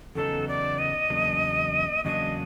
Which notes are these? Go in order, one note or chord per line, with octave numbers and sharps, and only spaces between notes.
E2 C#3 F#3 B3 D#4 A4
D5
D#5
E2 C#3 F#3 A#3 D4
E2 C#3 F#3 A#3 D4 D#5